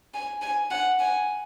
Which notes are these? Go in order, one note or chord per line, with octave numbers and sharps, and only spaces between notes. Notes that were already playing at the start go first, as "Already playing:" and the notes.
G#5
G#5
F#5
G#5